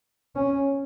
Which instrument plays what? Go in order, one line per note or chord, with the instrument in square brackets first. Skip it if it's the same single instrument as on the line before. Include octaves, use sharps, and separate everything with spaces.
[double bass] C#4